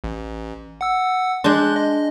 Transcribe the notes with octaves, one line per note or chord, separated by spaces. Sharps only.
A1
F#5 E6
G#3 D4 C6 F#6 G6
D#5